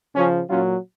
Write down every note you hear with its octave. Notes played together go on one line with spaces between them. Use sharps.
C#3 F3 C#4
A#2 F#3 C#4 F4